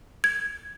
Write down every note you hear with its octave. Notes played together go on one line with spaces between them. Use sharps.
G#6